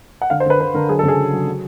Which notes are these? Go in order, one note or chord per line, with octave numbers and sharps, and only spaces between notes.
F#5
D3 F5
C5
D3 B4
D3 B4
D3 A#4
F#3 G#4
A4
C#3
G#4
F#3
F#3
F#3